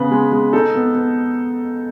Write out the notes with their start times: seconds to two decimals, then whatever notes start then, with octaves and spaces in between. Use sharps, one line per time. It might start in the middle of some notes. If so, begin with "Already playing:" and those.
Already playing: C#3 B3 B4
0.11 G#3
0.32 G#3
0.53 D#4 A4
0.75 B3
0.95 B3